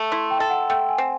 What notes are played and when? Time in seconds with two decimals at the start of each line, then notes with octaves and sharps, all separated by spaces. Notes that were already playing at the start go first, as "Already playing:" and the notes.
Already playing: A3
0.11 E4 C6
0.30 G5
0.40 A4
0.50 F#5
0.69 A3 G5
0.89 G#5
0.98 C4